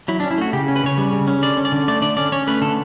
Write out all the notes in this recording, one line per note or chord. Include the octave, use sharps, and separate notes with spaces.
F#3 E4
D4
C#4
E4
A3 F#4
C#3 G4
C#4
B4
C#3 C#5
G3
C#3
C#4
D3 D5
C#4
D5
D3
A3 D5
D3 D5
C#4 D5
C#4 C#5
A3 B4
D3 A4